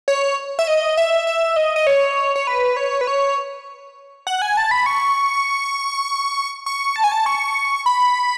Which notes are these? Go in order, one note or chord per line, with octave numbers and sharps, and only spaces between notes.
C#5
E5
D#5
E5
E5
D#5
D#5
C#5
C#5
B4
C#5
B4
C#5
F#5
G#5
A5
B5
C#6
C#6
A5
G#5
A5
C#6
B5